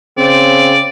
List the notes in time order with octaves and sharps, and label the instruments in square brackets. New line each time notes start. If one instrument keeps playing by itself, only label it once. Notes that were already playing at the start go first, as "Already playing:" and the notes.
[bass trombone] C#3 [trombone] C4 [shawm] D5